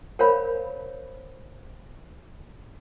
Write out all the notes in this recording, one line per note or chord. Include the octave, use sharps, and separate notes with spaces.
A#4 C5 C#5 F5 B5